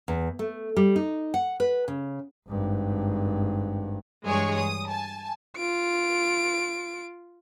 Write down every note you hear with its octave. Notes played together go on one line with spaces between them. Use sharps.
E2
A3
G3
D#4
F#5
B4
C#3
G#1 G2
G2 E3 G#3 G#4 C#5 C#6
D#6
G#5 A5
F4 D7